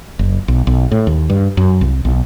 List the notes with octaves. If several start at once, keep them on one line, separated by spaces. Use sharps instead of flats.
F#1
B1
B1
A2
D#2
G2
F#2
C2
B1